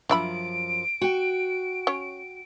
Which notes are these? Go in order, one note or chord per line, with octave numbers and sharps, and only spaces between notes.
F#2 F3 D4 E5 B5 D7
F#4 G5
C#4 C#5